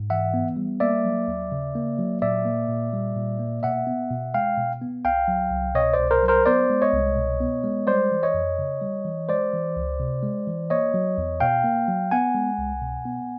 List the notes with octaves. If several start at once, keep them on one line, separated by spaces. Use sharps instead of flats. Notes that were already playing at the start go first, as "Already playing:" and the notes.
Already playing: G#2
E3 E5 F#5
B3
G3
A#3 D5 E5
F#3
D#2
C#3
A#3
F#3
A#2 D5 E5
A#3
A#2
G3
A#2
A#3
B2 E5 F#5
B3
B2
G#3 F5 G5
B2
B3
C2 F5 G5
F#3
C2
B2 C#5 D#5
C5 D5
C2
A#4 C5
F#3
A#4 C5
B3 C5 D5
G#3
C#5 D#5
C2
B2
B3
G#3
G3 C5 D5
E3
C#5 D#5
F2
C#3
G3
E3
G#3 C5 D5
E3
C#2
C3
G#3
E3
A#3 C#5 D#5
F#3
E2
B2 F5 G5
A#3
F#3
B3 F#5 G#5
G#3
C2
B2
B3